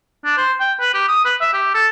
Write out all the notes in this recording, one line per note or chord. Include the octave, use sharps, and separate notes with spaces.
D4
C5
G5
B4
G4
D#6
B4
E5
G4
A4